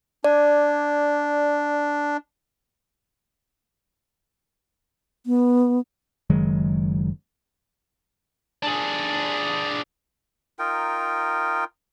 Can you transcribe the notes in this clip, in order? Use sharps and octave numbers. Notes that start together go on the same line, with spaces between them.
D4 D5
B3
F#1 D#3 F#3 G#3
D4 G#4
D#4 F4 A#4 G5